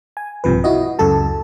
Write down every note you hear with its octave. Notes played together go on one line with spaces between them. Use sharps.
G#5
B1 G2 C3 F3 B4
E4 F#4 D#5
C#2 F#2 C#3 A4 A5